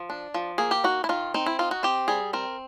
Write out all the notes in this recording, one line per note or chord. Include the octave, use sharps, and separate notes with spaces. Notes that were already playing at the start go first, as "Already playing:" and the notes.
Already playing: F3
D4
F3
A#3 G#4
G4
D#4 F#4
E4
D#3 F4
C4 D#4
E4
D#4 F4
F#4
C4 G4
G3 G#4
C4 A#4